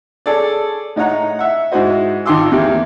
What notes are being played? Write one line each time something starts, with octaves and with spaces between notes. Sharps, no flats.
G#4 A4 C#5 D5
A2 D#4 C#5 F#5 A#5
E5 F#5
G#2 E4 F#4 C5 D#5
G#1 D#3 F4 C6 D6 E6
E2 A#3 G4